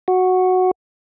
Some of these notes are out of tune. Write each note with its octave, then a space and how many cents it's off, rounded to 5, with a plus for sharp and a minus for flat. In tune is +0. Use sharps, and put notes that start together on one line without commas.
F#4 -5